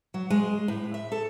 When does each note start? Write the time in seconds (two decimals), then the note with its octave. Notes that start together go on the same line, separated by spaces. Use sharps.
0.14 F#3
0.30 G#3
0.68 A2
0.94 E5
1.12 A4